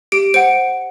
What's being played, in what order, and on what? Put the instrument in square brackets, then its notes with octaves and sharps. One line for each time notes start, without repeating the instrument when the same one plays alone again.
[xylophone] G4 D7
C5 F#5 D7